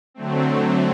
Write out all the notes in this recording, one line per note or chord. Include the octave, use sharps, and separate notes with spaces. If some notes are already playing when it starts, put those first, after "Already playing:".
D3 F#3 A3 C4